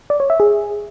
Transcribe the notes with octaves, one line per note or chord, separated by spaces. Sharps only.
D5
C#5
E5
G#4